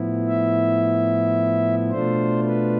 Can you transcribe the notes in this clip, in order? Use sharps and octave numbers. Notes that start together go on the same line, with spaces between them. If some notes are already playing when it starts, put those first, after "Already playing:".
Already playing: A2 F3 B3 E4
E5
B2 A3 D4 F4 C5
B4